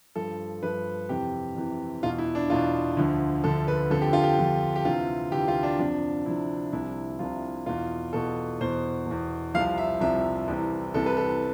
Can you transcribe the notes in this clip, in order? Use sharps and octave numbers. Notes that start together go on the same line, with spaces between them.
G2 F3 A4
G2 F3 B4
F2 C3 E3 G4
F2 C3 E3
E2 B2 F4
E4
D4
E2 B2 F4
D2 D3 F3
D2 D3 F3 A4
B4
F2 D3 F3 A4
G4
F4
G4
F2 D3 F3
G4
D2 C3 E3 F4
D2 C3 E3 G4
F4
D4
F2 C3 F3 D4
F2 C3 F3 E4
C2 C3 F3 E4
C2 C3 F3 F4
E2 B2 F4
E2 B2 A4
E2 B2 C5
E2 B2
C2 C3 F3 F5
E5
C2 C3 F3 E5
C2 C3 E3
C2 C3 E3 A4
B4
A4